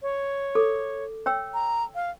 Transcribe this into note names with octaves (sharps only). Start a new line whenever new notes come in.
C#5
A4 D6
C#5 G5 E6
A#5
F5